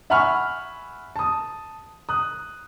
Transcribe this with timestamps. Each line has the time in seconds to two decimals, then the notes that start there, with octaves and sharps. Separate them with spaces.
0.10 E5 F#5 G#5 B5 C#6 F6
1.16 A5 D#6
2.09 D#6 F#6